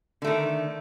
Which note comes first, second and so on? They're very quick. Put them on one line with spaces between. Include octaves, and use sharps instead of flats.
D3 A3 D#3